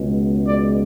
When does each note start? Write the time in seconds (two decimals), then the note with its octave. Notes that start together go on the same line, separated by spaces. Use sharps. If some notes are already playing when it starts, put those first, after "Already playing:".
Already playing: C#2 B2 G#3
0.45 D5